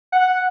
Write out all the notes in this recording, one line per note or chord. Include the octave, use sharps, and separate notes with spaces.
F#5